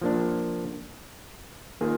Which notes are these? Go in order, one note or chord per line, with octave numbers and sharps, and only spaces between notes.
F3 A#3 D4
D#3 A#3 F4 G#4